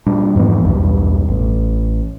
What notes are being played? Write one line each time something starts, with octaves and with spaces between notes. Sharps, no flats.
A#2 G3 D4
F2 G#2 E3 B3
B1 E2 G2
A1